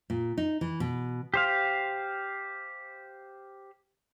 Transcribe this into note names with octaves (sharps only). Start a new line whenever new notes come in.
A#2
D#4
E3
B2
G4 C5 F5